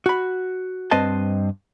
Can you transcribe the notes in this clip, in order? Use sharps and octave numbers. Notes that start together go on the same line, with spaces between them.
F#4 B5
G2 C4 B4 C5 D#5 A5